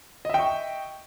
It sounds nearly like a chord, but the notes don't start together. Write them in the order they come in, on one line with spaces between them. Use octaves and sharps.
D#5 E5 G5 C#6